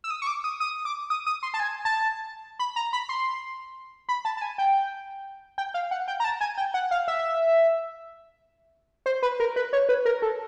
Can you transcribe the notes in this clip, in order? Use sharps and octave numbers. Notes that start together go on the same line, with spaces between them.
E6
D#6
C#6
D6
D#6
D#6
D6
D#6
D#6
C6
A5
G#5
A5
B5
A#5
B5
C6
B5
A5
A5
G#5
G5
G5
F5
F#5
G5
A#5
A5
G#5
G5
F#5
F5
E5
C5
B4
A#4
B4
C#5
B4
A#4
A4